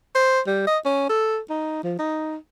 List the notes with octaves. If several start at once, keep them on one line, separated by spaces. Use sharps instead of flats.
C5
G3
D#5
C#4
A4
D#4
F3
D#4